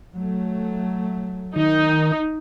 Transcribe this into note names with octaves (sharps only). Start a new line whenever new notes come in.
F#3 A3
D#3 D#4